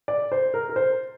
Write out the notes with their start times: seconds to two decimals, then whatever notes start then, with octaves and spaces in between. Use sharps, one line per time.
0.08 D5
0.32 C5
0.54 A#4
0.69 A#4
0.76 C5